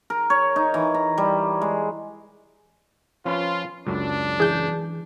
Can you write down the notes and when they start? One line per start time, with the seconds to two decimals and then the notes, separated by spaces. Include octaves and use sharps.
0.10 A#4
0.30 C#5
0.56 D#4
0.74 E3
0.94 A#5
1.18 G3
1.61 G#3
3.25 F3 C#4 F4 B4
3.87 C#2 F#2 D4
4.40 E3 G#4 G6